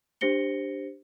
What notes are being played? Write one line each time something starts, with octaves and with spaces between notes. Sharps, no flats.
D4 G4 C5 A#6 C#7 G7